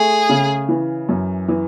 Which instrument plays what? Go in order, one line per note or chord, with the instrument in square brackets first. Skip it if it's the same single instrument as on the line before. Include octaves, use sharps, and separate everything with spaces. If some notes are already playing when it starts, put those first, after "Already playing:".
Already playing: [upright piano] A3 [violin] G#4
[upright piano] C#3
E3
F#2
E3